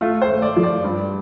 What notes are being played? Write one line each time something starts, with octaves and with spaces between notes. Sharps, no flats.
A3 F4
C5
A3
D5
F3
D5
G2